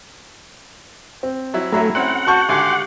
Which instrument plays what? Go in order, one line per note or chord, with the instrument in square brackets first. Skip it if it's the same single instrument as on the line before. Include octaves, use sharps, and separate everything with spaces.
[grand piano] C4
[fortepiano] F#3 E4
[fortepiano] G2 F#3 E5 [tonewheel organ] A3 [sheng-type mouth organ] E4 [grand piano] A#5
[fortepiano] C4 C#4 [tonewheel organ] F#5
[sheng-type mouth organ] F#4 [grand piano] A5 C#6 G6
[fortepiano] G#1 D3 G#5 [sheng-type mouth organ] G4 C6 D6